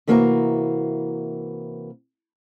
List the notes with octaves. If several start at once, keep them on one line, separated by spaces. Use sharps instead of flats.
C3 E3 A#3 F#4 F5 A#5